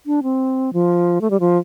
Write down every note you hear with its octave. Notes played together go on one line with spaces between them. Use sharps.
D4
C4
F3
A3
G3
F3